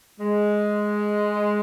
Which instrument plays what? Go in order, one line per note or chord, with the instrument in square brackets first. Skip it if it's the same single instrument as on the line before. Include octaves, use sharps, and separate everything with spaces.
[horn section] G#3